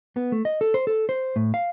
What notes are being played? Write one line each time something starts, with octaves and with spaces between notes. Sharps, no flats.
B3
A3
D#5
A4
C5
A4
C5
A2
F5